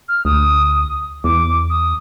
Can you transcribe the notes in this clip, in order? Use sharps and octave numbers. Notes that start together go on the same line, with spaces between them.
F6
D2 D#6
E2 D6
D#6